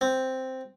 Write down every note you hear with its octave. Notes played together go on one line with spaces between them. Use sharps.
C4